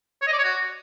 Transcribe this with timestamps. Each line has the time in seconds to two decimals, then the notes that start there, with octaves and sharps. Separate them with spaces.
0.22 C#5
0.27 D#5
0.33 D5
0.38 C#5
0.43 F#4